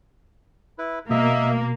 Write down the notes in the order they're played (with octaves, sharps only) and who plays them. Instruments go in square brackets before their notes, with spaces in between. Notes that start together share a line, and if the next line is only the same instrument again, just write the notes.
[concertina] E4 B4
[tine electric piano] B2 [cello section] A#3 [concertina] D#5 E5